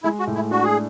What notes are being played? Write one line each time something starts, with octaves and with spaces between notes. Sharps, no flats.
G#3 E4
F#4
A2
E4
D4 F#4
G#4